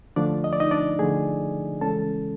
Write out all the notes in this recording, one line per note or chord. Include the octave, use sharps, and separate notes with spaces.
D3 F3 A3 D4 D5
D#5
D5
D#4 D#5
D4 D5
D3 F3 A3 G#4 G#5
C#3 E3 G#3 C#4 A4 A5